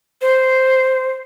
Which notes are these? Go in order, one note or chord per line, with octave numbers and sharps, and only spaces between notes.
C5